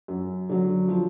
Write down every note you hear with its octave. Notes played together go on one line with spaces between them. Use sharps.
F#2
D3 F#3
F3